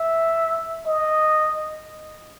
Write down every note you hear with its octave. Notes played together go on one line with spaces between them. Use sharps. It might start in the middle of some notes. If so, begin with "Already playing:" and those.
Already playing: E5
D#5